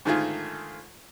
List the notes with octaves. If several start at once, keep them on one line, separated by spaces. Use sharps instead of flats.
G#2 D3 D#3 A3 F4 G#4